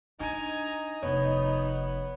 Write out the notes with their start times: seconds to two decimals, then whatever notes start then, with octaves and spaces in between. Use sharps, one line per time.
0.20 D4 D#4 G#5 A#5
1.03 F1 B3 C#5